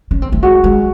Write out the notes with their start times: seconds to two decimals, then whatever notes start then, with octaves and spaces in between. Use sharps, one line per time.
0.11 C#4
0.22 C4
0.32 A3
0.43 G#3 F#4
0.64 G#3